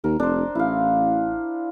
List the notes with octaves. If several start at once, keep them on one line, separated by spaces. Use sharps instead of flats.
D#2 A#4
F1 D4 C5
A1 E4 F5